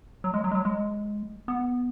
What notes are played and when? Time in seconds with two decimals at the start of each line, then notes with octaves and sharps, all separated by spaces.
0.24 F#3
0.34 G#3
0.44 F#3
0.51 G#3
0.55 F#3
0.65 G#3
1.48 B3